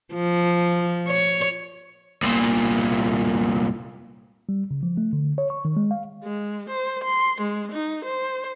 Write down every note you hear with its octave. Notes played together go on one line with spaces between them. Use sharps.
F3
C#5
C2 A#2
G3
C#3
F3
A3
D3
C#5
C#6
D#3
G#3
F5
G#3
C5
C6
G#3
D#4
C5